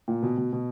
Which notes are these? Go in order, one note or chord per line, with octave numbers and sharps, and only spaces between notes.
A#2
B2
B2
B2